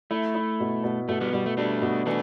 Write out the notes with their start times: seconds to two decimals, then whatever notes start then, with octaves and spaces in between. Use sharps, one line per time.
0.11 A3 E4
0.35 E4
0.60 B2
0.84 B2
1.09 B2 A3
1.21 G3 B3
1.33 B2 G3
1.46 A3
1.57 G3 A3 D4
1.82 B2
2.06 E3 A3 D4